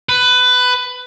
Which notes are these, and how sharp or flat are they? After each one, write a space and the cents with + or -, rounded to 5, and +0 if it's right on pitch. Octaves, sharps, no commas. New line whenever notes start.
B4 +15